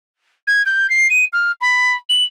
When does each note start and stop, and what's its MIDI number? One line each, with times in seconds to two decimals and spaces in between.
0.47 0.62 92
0.65 0.89 91
0.89 1.07 96
1.10 1.25 99
1.33 1.52 89
1.61 1.96 83
2.09 2.24 102